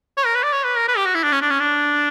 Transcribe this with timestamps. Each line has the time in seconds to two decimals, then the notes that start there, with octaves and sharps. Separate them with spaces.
0.17 C#5
0.26 A#4
0.35 B4
0.43 D5
0.53 C#5
0.64 B4
0.77 A#4
0.88 B4
0.97 G4
1.06 F#4
1.15 E4
1.23 D4
1.32 C#4
1.41 D4
1.50 C#4
1.60 D4